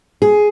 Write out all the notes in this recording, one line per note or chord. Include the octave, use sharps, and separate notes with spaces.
G#4